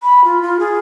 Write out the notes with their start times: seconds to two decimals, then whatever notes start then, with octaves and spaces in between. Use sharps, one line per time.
0.03 B5
0.25 F4
0.42 F4
0.60 G#4